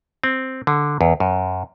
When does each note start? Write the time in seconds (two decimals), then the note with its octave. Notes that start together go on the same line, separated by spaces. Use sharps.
0.24 C4
0.67 D3
1.01 E2
1.20 F#2